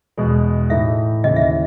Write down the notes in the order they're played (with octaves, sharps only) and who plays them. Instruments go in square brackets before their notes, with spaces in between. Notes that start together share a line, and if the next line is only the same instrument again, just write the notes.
[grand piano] E2 B2 G#3
[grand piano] A2 E3 A3 D#4 [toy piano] E5
[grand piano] D#2 C#3 E3 [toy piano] D#5
[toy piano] E5
D#5